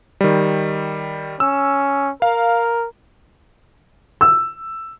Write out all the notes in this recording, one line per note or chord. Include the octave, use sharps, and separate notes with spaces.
D#3 G3
C#4 E6
A#4 F5
E6